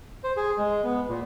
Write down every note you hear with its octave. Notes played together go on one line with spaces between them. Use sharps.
C5
G#4
G#3
B3
A#2